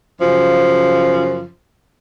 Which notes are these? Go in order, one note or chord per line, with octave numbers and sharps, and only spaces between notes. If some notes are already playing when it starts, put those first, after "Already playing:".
F#2 C#3 F3